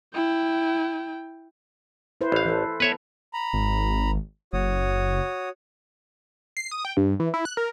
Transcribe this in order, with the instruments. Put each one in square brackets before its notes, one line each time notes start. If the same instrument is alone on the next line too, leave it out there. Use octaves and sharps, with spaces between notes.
[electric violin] E4 G5
[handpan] E4 B4 C5
[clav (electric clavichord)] A1 F5
[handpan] E3 A4
[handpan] B3 A4 [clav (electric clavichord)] B4 C#5 E5
[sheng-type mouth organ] A#5 B5
[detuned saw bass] G#1
[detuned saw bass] F#1 [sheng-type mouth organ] F#4 C#5 D#6
[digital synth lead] C7
D#6
G5
G2
E3
E4
F#6
A#4